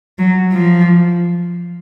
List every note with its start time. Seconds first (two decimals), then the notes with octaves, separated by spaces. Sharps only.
0.19 F#3
0.52 F3